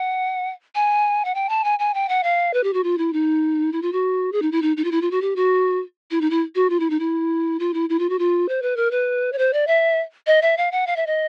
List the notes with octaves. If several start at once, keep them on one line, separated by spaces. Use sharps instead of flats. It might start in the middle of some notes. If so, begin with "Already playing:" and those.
Already playing: F#5
G#5
F#5
G5
A5
G#5
G#5
G5
F#5
F5
B4
G4
F#4
F4
E4
D#4
E4
F4
F#4
G#4
D#4
E4
D#4
D#4
F4
E4
F4
F#4
G4
F#4
E4
D#4
E4
F#4
F4
E4
D#4
E4
F4
E4
E4
F4
F#4
F4
C5
B4
A#4
B4
C#5
C5
D5
E5
D#5
E5
F5
F#5
F5
E5
D#5